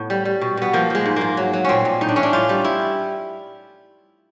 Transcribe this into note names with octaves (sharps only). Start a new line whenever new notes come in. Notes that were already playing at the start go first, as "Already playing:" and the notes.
Already playing: A2 B3
G3
G3
B2
B2 B3
F3 A#3
F3 G#3
G#2
G#2 A#3
F#3
F#3
A#2 C4 C#4
A#2
A2 D#4
D4
E3 C#4
D4
A2 F4
G3
E4